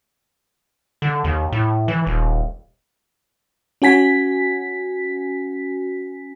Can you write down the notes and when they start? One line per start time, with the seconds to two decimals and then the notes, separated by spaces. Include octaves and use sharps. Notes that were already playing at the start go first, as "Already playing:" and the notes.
1.02 D3
1.24 D#2
1.52 A2
1.88 E3
2.07 D#1
3.82 C#4 F#4 G#5 B6